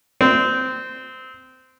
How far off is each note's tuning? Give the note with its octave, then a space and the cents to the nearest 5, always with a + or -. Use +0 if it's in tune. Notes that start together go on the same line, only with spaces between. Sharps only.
C4 -20